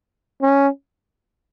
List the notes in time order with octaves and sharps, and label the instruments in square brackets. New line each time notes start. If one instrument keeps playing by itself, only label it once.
[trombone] C#4